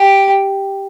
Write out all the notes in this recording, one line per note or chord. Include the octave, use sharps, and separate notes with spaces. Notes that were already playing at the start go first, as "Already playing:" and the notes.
Already playing: G4